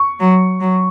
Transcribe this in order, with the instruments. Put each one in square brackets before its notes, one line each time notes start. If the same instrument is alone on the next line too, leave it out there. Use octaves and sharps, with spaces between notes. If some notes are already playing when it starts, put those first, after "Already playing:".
Already playing: [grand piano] C#6
[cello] F#3
F#3